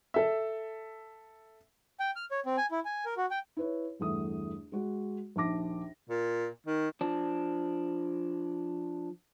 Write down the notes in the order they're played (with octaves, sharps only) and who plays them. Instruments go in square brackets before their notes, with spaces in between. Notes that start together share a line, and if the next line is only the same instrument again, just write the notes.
[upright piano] A4 E5
[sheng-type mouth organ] G5
F6
C#5
C4
G#5
E4
G#5
A#4
F#4
G5
[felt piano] E4 B4 C#5
G1 E2 A3 D#6
G#3 F#4
A#1 D#2 A5 D6 A#6
[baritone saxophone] A#2
D#3
[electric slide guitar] F3 D4